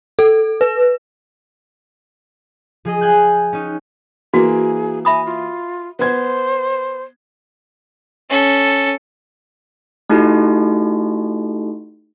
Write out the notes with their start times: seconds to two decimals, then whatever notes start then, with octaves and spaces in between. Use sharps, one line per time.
0.19 A4
0.61 B4
2.85 F3 G#4 D#5
3.01 G5 G#5 F#6 G6
3.53 C#4 D#4
4.34 E3 A#3 F#4 G#4
5.05 E5 G#5 B5 D#6
5.26 F4
5.99 B3 C5 G#6
8.30 C#4 A4
10.09 A3 D#4 E4 F#4 G4 A4